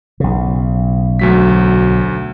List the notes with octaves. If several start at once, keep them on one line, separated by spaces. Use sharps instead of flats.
B1 C#3
D2 F#3 B6